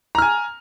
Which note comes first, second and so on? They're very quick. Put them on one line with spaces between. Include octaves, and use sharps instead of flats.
A#5 F6 G#5